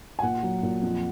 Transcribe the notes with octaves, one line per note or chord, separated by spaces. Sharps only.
G#5
A#2 F#5
F#3
A#2
F2